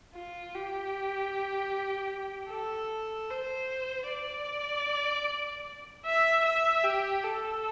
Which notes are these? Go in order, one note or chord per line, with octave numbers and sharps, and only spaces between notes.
F4
G4
A4
C5
D5
E5
E5
G4
A4